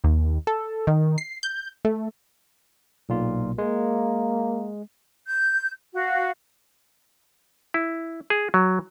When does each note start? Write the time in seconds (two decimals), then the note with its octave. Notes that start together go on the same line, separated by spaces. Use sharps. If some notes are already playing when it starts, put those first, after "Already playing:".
0.04 D#2
0.47 A4
0.87 D#3
1.18 C7
1.43 G6
1.85 A3
3.09 B1 A#2 F4
3.58 G#3 A#3
5.25 G6
5.94 F#4 F5
7.74 E4
8.30 G#4
8.54 F#3